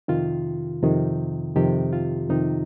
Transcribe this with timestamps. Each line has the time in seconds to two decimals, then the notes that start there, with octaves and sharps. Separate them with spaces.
0.08 F2 C3 D#3 F4
0.82 F2 C3 D#3
1.56 F2 C3 D#3 G4
1.93 F4
2.30 F2 C3 D#3 D#4